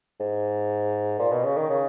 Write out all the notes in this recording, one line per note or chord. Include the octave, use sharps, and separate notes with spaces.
G#2
A#2
B2
C#3
D#3
C#3